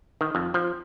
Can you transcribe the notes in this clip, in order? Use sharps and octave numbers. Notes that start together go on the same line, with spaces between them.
D#3
F2
F3